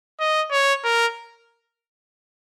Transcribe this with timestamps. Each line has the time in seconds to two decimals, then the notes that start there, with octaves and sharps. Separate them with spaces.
0.20 D#5
0.52 C#5
0.84 A#4